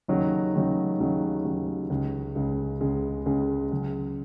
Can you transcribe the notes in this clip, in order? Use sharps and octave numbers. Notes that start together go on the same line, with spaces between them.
D#2 C#3 F#3 D#4
D#2 C#3 F#3 D#4
D#2 C#3 F#3 D#4
D#2 C#3 F#3 D#4
C#2 C#3 G#3
C#2 C#3 G#3
C#2 C#3 G#3
C#2 C#3 G#3
C#2 C#3 F#3